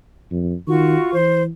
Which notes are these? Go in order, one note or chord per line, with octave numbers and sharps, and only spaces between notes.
F2
D#3 F4 F#4 C#6
E3 C5